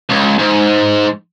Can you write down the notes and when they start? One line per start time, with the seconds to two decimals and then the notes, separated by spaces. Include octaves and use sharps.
0.09 C#2
0.38 G#2